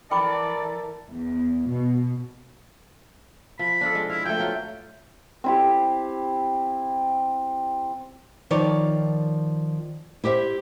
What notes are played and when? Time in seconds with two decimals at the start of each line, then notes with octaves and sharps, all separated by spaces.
0.11 E3 A4 A#4 D5 G5 B5 D6
1.11 E2
1.69 B2
3.59 F3 B5
3.81 D4 F4 A4
3.95 G#3
4.09 E4 F5
4.25 F3 A3 G5
4.39 F#3 F4 B4
5.44 C4 E4 G4
8.51 D#3 F3 C#5 D5
10.24 E4 G4 C5 E5